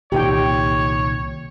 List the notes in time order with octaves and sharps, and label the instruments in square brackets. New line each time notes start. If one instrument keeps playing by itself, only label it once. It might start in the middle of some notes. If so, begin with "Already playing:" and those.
[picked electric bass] C2 A#2 D#3 [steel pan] G4 G5 [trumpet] C#5